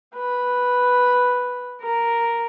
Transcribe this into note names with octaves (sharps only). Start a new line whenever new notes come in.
B4
A#4